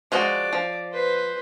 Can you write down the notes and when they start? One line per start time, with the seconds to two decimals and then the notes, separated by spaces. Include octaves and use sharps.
0.12 F3 G#3 F#4 D5
0.53 F3
0.92 B4 C5